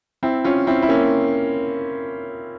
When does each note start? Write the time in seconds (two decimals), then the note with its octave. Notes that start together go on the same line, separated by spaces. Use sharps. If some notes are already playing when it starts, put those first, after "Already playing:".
0.23 C4 E4
0.44 C#4 F4
0.67 C4 E4
0.82 E4
0.89 A#3 C#4